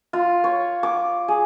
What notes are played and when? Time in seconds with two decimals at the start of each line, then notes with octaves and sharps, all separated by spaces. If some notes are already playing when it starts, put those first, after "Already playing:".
0.13 F4
0.44 C#5
0.83 D6
1.28 G#4